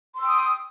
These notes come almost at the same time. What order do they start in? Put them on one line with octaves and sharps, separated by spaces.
C6 E6 G5 D#6